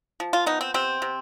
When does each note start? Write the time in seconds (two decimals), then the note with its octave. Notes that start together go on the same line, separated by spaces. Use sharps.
0.20 F3
0.33 F4
0.46 B3 D#4
0.61 C4
0.74 C3 C4
1.02 C3